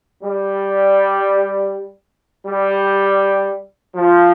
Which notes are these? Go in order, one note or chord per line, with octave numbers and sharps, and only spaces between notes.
G3
G3
F3